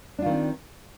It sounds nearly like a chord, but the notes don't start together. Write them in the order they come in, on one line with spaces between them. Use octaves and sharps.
D4 F4 D#3 C4